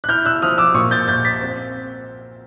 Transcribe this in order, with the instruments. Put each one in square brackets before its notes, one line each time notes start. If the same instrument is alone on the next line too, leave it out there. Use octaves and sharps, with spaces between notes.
[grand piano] F#6
E4 F6 G6
E6 F#6
F3 D#6 F6
D6 E6
A#2 C#6 D#6
G6 A6
A#2 G6 A6
A6 B6
C4